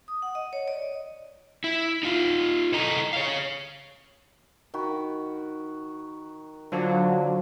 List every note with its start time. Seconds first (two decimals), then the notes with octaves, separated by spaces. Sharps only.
0.08 D#6
0.22 F#5
0.35 D#5
0.53 C#5
0.68 D5
0.82 D#5
1.64 E4
2.03 D#4 F4
2.74 E4 A4 D#5 A#5
3.13 C#5 F5
4.74 D#3 F#4 B5
6.72 D3 F3 F#3 D4